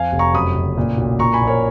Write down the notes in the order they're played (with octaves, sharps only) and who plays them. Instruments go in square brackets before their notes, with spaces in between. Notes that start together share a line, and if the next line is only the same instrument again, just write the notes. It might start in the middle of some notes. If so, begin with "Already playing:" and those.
Already playing: [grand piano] F2 F5 G#5
F1
A#5 C#6
F#2 B5 D#6
F#1
A#2
B1
A#2 A#5 C#6
G#5 B5
A#1
A#4 C#5